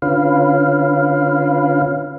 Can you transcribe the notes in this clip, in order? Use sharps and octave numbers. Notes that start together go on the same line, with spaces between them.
D3 C#4 F4 B4 F5